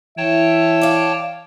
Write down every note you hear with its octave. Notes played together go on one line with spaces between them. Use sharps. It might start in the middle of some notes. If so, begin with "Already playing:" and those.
E3 C#5 E5 G5 A5
D5 F5